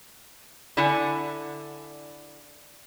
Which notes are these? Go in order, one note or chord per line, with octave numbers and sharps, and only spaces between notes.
D3 E4 F#5 G#5